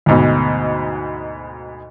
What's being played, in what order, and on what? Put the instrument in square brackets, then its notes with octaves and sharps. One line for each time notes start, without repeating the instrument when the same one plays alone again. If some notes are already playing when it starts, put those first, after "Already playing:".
[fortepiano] D2 G#2 B2